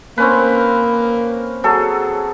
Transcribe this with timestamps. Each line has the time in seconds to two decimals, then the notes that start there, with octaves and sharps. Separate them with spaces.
0.18 A#3 C4 C#4 B4
1.64 F#3 G#4 A4